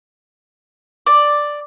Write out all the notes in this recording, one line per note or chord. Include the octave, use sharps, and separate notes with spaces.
D5